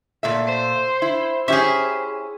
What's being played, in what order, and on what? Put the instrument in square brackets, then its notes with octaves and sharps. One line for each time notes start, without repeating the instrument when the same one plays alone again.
[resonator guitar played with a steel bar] A#2 A3 E5
[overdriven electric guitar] C5
[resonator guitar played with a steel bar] E4
[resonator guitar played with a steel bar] C#4 E4 G4 [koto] G#4 E5